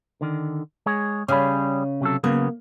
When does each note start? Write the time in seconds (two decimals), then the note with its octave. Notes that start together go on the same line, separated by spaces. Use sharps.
0.21 D3 D#3
0.86 G#3 G#4 C#5
1.28 C#3 G3 C#4 G#4 B5
2.01 C3 F#3 A4
2.24 C#3 F#3 A#3 B3